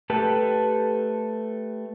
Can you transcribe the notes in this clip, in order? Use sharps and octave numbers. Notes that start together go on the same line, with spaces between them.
A3 G4 A4 B4